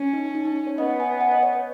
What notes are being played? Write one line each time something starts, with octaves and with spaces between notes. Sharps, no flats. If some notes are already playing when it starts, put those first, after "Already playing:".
Already playing: C#4
D#4
D#4
D#4
D#4
C#5
B3 D#5
G#5
F#5
D#5
C#5
C#5